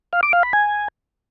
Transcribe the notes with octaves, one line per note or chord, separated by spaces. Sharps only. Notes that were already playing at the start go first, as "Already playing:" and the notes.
F5
D6
F5
B5
G#5